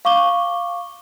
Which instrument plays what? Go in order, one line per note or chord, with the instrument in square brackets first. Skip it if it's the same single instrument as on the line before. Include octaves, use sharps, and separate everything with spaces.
[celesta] F5 C#6 D6 G7